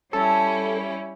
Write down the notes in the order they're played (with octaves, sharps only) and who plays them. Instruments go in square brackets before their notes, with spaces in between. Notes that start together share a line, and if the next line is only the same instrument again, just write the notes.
[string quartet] G3 C#4 E4 [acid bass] A4